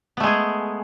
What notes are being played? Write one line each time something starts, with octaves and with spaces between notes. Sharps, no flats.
G#3 A3 B3 G#4